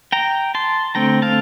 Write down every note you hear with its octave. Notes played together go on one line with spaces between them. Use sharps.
G5 A#5
A5 C6
D3 A3 C4 G5 A#5
F5 A5